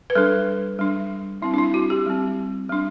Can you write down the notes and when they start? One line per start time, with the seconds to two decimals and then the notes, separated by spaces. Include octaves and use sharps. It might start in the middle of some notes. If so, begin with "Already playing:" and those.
0.10 B4
0.15 G3 D4 A4
0.79 G3 D4
1.42 G3 C4 E4
1.54 D4
1.58 E4
1.74 F#4
1.90 G4
2.06 G3 C4
2.69 G3 D4